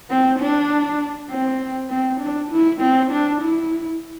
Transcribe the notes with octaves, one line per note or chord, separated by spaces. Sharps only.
C4
D4
C4
C4
D4
E4
C4
D4
E4